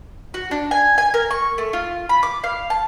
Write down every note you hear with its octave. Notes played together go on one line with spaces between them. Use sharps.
F#4
D4
G#5
G#5
A#4
C#6
A3
F4
B5
D6
F5
A5